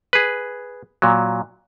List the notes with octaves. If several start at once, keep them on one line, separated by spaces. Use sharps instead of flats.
G#4 B4
A#2 F#3